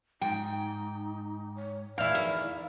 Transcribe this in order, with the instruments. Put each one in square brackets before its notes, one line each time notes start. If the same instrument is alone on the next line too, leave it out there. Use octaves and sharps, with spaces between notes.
[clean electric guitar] G#2 [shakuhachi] D#4 [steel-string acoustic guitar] G5
[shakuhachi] C#5
[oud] E2 E4 [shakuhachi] D5 [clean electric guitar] F5
[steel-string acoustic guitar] D#3